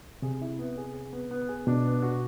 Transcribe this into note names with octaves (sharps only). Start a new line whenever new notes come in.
C3 G#4
E4
B3
G#4
G#4
B3
B3
G#4
B2 D4
B3
F#4